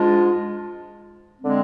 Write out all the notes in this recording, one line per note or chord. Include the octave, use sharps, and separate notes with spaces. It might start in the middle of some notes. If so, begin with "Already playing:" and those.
Already playing: G#2 G#3 D4 F4
D3 G#3 C4